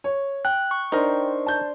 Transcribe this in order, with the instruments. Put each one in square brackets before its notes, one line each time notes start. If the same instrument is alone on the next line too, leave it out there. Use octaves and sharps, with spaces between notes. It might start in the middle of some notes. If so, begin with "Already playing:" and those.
[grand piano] C#5
[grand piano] G5 [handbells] F#6
[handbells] C#6
[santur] D4 C5 [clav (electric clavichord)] D#4 A#4
[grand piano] A5 G6